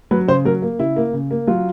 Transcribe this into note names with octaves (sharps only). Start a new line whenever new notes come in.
F#3 B4
C#3 C5
F#3 A#4
A#3
C#3 E4
A#3
C#3
A#3
F#3 F4